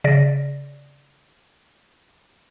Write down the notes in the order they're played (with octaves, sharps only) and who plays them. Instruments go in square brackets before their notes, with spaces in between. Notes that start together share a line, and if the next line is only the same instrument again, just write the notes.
[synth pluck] C#3 D5 A#6